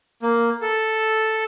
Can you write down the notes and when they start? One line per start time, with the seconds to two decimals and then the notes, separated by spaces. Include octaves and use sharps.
0.22 A#3
0.62 A4